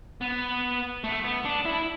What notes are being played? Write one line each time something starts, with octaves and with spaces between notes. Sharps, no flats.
B3
A3
B3
D4
E4